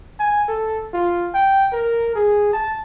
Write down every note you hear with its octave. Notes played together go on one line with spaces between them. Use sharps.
G#5
A4
F4
G5
A#4
G#4
A5